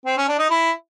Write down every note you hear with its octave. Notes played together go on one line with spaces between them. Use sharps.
C4
C#4
D4
D#4
E4